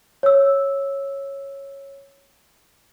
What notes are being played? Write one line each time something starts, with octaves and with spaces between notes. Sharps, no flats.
C#5 E6